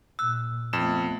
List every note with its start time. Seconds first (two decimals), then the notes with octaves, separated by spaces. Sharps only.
0.19 A#2 E6 F#6
0.73 F2 A3 B3 E7